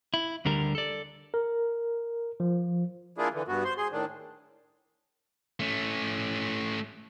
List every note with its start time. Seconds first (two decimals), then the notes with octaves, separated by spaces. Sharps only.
0.14 E4
0.45 D2 D3 G3 A#4
0.75 A4 D5
1.34 A#4
2.40 F3
3.18 A#3 D4 E4 F4 G#4
3.33 D3 E3
3.48 G2 B3 F#4
3.65 C5 C6
3.78 G#4 C6
3.92 A2 D#3 D4
5.60 A3 C#4